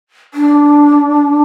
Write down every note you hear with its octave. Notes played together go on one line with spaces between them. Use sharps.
D4